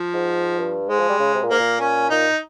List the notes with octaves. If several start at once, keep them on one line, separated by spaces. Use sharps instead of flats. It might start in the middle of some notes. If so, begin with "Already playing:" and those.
Already playing: F3
G#2
G2
G#2 G#3
F3
G3
C#3
C3
A#2
G#2 A#3
A#2
C#4
A#2 D#4